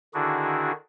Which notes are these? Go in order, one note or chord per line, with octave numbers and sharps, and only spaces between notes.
D3 D#3 D4 E4 F#4 G#4